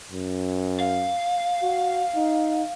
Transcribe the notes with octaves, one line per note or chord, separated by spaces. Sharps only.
F#2
F5
F#4
D#4